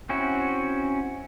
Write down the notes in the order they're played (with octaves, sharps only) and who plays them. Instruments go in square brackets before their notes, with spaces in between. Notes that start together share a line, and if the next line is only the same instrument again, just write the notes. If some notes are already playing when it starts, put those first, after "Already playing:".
[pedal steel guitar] C4 C#4 E4 F#4